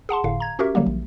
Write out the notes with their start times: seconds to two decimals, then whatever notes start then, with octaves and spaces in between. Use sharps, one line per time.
0.09 G#4 F#5 A5 C6
0.24 G1 A2 D3 F5
0.40 A#5 G#6
0.59 C#4 F#4 G4 A#4 E5
0.75 D3 F#3 G3 A#3
0.86 A#1